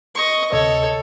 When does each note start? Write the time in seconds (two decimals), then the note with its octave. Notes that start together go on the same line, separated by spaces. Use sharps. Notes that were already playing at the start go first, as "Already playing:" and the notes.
0.15 D#5 C#6
0.52 D2 C3 A4 C#5 D#5